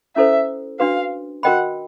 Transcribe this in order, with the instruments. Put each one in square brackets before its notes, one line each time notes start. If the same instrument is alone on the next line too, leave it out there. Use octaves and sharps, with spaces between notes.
[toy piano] C#4 E4 A4 C5 [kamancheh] E5
[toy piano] D4 F#4 B4 [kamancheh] F5
[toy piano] F#4 A#4 D#5 G5 B5 [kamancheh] F#5